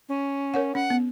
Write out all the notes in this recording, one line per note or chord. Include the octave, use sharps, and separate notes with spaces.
C#4
A#4 C#5 F#5
C#4 F#5
B3